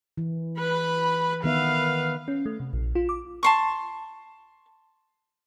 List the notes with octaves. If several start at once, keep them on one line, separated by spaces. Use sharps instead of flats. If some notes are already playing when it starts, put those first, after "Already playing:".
E3
B4 B5
D#3 B3 B4 E5 F5
C#4
A3
C3
A#1
F4
D6
A5 C6 C#6